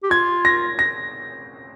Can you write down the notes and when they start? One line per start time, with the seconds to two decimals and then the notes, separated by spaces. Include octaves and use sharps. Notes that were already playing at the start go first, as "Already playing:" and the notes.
0.03 G4
0.10 F4 G#6
0.45 A#6
0.79 A#6